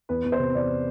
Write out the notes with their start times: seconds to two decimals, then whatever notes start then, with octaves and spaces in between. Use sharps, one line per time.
0.09 E2 B4
0.24 E2
0.32 C5
0.39 C3
0.54 E2 D5